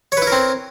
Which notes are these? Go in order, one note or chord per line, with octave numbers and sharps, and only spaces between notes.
C4 E4 A#4 B4 C#5